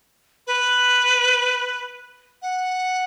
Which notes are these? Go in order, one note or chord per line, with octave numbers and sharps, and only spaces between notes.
B4
F#5